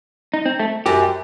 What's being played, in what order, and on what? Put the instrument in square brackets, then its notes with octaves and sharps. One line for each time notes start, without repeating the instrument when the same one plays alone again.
[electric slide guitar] D#4
C4
A3
[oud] F#2 [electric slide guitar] G4